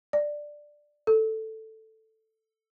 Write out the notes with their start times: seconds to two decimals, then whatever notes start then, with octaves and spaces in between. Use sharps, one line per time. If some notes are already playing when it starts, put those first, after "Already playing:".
0.13 D5
1.07 A4